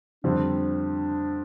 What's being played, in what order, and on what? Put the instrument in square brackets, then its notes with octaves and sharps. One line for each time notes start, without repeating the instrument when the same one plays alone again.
[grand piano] F2 D3 G3 C4 [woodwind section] D4